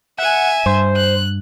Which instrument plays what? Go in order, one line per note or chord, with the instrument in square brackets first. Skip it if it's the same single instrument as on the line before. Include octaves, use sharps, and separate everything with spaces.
[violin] E5 G#5 [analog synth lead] F#5
[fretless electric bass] G2 [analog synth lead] C5
[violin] F#6